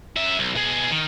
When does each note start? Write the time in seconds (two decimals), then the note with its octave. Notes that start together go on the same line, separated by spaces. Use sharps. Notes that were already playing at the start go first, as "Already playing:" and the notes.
0.16 F#2 E5
0.39 B1
0.55 B2 G#4
0.91 D#3